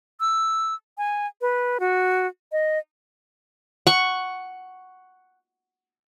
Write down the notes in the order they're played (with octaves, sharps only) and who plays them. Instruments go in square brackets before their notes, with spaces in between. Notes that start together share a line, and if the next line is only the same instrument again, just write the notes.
[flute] E6
G#5
B4
F#4
D#5
[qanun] F#5 C#6